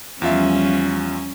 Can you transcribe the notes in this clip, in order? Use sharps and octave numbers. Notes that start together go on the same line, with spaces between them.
E2 F3 G3 C#4 F4 E5